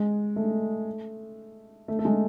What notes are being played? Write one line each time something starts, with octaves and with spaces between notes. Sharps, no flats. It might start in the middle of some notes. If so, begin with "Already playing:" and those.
Already playing: G#3
A3
A3
A3
G#3